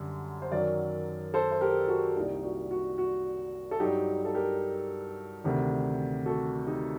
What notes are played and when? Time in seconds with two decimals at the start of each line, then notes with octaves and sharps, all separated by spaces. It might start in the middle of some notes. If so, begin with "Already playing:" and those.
Already playing: F#2 D3 G3
0.42 C5
0.52 F#2 D#3 F#3 A#4 D5
1.34 A4 C5
1.52 C5
1.61 G4 A#4
1.88 F#4 A4
2.06 F#4
2.16 C2 A#2 G3 D#4 G4
2.43 F#4
2.71 F#4
2.98 F#4
3.71 A4
3.80 G2 F#3 D#4 G4
4.25 A4
4.34 G4 A#4
5.44 D2 C3 D#3
6.26 F#4 A4
6.67 D#4 G4